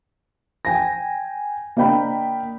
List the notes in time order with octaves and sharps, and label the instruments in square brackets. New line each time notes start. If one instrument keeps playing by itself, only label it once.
[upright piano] G5 G#5 A#6
A#3 D4 D#5 G5 B5